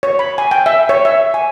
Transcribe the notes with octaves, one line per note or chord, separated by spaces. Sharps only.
C#5
B5
G#5
G5
E5
C#5
E5
G#5